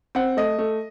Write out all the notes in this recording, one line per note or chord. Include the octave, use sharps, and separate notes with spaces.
C4 F#5
A3 D#5
A3